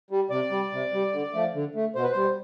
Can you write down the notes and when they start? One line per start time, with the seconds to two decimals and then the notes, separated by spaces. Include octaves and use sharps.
0.10 G3
0.30 C3 D5
0.51 G3
0.72 C3
0.93 G3
1.13 D3
1.34 F3 A3
1.55 D3
1.75 A3
1.95 B2 C5
2.03 B4
2.12 G3 C5